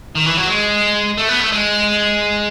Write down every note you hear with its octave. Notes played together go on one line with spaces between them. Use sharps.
D#3
E3
F#3
G#3
A3
B3
A3
G#3